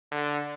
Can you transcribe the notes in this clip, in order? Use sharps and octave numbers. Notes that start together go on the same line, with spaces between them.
D3